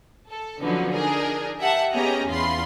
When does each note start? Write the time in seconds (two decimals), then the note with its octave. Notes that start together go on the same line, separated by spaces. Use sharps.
0.30 A4
0.61 D3 F3 F#3 B3 C#4 D#4
0.93 D4 D#4 G#4 A#4
1.59 G4 E5 F#5 A5
1.92 B3 C#4 G4 G#4 D#5 A#5
2.28 E2 F4 B5 C6